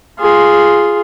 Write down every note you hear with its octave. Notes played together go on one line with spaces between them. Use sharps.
F4 G#4